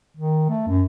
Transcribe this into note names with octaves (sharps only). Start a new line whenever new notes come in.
D#3
A3
F#2